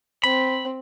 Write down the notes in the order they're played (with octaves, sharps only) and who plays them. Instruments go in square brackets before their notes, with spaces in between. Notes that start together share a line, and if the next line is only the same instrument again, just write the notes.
[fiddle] C4 [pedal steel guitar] B5